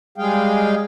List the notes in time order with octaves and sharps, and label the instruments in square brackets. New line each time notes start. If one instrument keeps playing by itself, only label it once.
[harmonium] G3 G#3 G#4 F5 G5